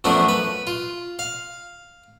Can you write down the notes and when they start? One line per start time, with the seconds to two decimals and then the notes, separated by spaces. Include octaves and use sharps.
0.04 F#2 F3 A3 B3 D4
0.29 B4
0.67 F4
1.19 F5